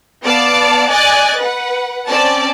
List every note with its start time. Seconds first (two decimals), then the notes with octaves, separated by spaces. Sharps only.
0.25 B3 D5 F5 A5 D6
0.89 D5 D#5 G#5 F#6 A6
1.39 B4 F#5
2.09 C4 C#4 D5 A5